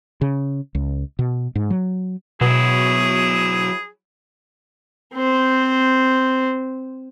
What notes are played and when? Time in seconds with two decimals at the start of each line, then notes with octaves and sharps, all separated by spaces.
0.21 C#3
0.75 C#2
1.19 B2
1.55 G#2
1.70 F#3
2.41 B2 F#3 E4 G#4
5.14 C4 C5